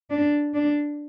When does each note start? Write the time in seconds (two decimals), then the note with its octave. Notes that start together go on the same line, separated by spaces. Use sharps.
0.10 D4
0.54 D4